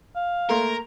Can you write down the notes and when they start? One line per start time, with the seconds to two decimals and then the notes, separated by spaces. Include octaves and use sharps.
0.16 F5
0.49 A3 A#3 A#4 C6